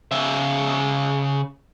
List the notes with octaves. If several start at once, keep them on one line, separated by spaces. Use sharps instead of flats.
C#3 E5